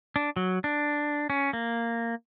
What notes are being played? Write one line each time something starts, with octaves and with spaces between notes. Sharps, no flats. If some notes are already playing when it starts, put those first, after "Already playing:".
D4
F#3
D4
C#4
A#3